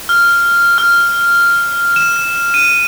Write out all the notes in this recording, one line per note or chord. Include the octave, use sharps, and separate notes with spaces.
F6
F6
E7
D#7